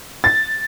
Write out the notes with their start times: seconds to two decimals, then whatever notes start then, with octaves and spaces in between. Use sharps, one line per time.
0.24 A6